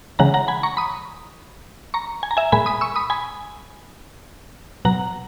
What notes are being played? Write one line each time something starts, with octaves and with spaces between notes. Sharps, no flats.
C#3 E3 G#3 F#5 A#5
F#5 A#5
G#5 B5
A#5 C#6
B5 D#6
A#5 C#6
G#5
A#5
E5 G#5
A#2 G#3 G#5 B5
B5 D#6
C#6 E6
B5 D#6
G#5 B5
B2 F#3 F#5 A#5